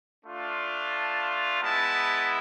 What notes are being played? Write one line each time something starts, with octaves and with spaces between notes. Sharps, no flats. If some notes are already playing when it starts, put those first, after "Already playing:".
A3 D4 F4
A5
G#3 B3 E4 A5